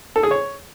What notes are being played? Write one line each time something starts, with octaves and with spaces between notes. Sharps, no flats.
A4
G#4
C#5